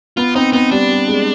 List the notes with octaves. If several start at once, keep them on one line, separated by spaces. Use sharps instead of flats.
B3 F4
C4 D#4
B3 D#4
G3 D4
G3
G#3